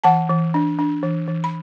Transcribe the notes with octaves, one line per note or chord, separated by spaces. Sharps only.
E3 F#5 A5
E3
D4
D4
E3
E3
B5